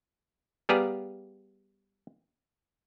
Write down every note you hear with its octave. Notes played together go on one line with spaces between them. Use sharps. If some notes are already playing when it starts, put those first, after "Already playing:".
G3 B3 G4 G#4 F5 A#5